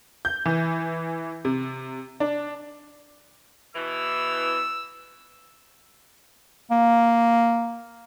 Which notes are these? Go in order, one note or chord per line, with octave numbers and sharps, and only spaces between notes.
G6
E3
C3
D4
B2 E3 E6
A#3